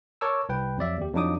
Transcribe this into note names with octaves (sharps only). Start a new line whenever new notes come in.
A#4 C#5 A5 C#6 D6 E6
C2 B4 G5
F2 F#3 D5 E5
D#2 G4
F2 F#3 D4 D#4 D6 D#6